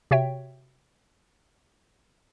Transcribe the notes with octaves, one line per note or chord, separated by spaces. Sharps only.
C3 F#4 C#5 E5 G5